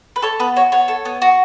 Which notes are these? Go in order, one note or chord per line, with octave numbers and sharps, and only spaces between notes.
B4
A4 C#5
B3 B4
F#4 C#5
B3 C#5
A4
B3
F#4